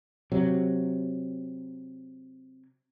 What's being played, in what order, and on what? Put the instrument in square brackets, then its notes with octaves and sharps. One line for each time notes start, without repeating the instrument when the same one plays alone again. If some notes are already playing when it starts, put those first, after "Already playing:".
[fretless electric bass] C3 F#3